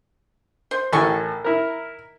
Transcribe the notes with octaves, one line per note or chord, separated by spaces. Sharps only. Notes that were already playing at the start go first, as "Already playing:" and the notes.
C5
A1 A2 D#3 A4 G#5 C#6
E4 A#4